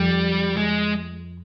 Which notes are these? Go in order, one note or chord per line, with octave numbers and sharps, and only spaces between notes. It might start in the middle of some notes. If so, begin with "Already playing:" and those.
Already playing: F2 G3
G#3